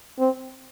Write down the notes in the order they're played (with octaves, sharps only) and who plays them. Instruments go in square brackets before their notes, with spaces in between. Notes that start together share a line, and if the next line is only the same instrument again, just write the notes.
[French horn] C4